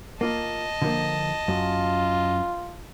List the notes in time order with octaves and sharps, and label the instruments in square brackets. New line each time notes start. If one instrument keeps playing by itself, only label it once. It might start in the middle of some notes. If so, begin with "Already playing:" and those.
[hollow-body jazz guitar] A#3 F4 [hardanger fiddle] D#5 A5
[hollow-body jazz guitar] D3 F3 A#3
[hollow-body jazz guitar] F#2 [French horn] F4